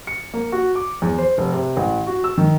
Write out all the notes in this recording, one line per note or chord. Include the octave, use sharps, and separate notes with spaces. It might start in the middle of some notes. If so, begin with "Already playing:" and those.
C#7
A#3
F#4
D6
E2
C5
F1
C3
A1
F#4
E6
D#3